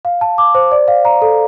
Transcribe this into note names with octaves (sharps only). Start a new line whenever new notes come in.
F5
A5
D6
C5
D5
F5
A#5
A4